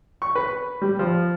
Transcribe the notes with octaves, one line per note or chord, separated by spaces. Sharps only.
C#6
B4
G3
F3